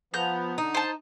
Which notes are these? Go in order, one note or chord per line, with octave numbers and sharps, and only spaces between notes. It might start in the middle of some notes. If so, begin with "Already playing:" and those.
F3 B3 A#5 F#6 G6
D3 D#4
C5 A5